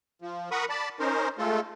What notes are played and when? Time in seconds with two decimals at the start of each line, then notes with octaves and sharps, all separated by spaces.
0.22 F3
0.51 A#4 F#5 B5 C#6 D#6
0.69 D5 A5 B5
1.00 C#4 D#4 A#4 C5
1.38 G#3 A3 F4 A4